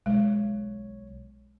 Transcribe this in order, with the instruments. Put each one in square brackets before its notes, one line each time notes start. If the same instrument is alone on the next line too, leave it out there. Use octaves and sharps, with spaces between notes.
[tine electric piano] B1 C#5 [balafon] G#3